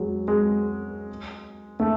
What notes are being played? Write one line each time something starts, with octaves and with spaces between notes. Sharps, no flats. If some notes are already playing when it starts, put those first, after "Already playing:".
Already playing: F#3 G#3
G#3
A3